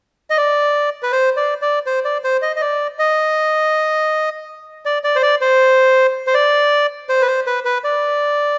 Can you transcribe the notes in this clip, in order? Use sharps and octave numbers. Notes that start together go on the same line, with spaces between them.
D#5
D5
B4
C5
D5
D5
C5
D5
C5
D#5
D#5
D5
D#5
D5
D5
C5
D5
C5
C5
D5
C5
B4
C5
B4
B4
D5